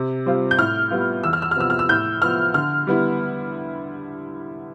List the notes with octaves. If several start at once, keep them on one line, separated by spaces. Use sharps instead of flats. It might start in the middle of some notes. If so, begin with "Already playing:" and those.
Already playing: C3
G3 C4 F4
G6
A2 F6
G3 B3 F4
E2 E6
F6
E6
F6
C3 F3 B3 E6
F6
E6
A2 G6
F3 B3 F6
D3 F6
G3 B3 E4